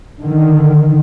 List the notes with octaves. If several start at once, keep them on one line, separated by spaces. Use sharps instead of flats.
D3 D#3